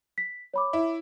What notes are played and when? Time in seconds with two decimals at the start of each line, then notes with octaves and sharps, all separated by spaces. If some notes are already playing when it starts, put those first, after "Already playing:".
0.18 B6
0.54 C#5 B5 D6
0.73 E4